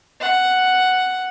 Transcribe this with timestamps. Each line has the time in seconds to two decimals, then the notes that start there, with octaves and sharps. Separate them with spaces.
0.20 F#5